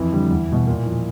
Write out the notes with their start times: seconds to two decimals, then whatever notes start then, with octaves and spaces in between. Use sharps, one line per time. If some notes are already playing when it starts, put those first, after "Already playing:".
Already playing: F2 E3 E4
0.12 D3 G3
0.30 E2
0.49 B2 G3
0.67 A#2
0.86 F3